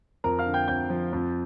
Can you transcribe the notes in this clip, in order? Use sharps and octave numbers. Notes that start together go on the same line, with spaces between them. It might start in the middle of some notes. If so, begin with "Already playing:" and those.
F2 A#4 A#5
F5 F6
D3
G5 G6
F2 G5 G6
F3
F2